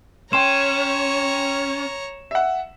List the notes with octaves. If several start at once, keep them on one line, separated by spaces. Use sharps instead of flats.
C#4 C#5 G5 A#5 C6 E7
E5 F#5